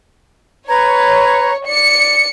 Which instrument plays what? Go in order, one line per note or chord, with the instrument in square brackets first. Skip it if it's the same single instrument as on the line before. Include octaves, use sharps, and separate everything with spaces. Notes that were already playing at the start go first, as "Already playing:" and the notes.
[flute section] B4 A#5 G#6 [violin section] C#5
[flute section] D5 [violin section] C#7